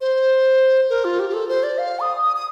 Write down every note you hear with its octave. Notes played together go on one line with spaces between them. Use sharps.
C5
A#4
F4
G4
G4
A4
C5
D5
F5
D#6
D#6
D#6